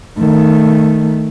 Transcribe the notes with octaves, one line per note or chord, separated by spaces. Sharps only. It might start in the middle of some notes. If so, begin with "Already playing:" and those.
D#3 A3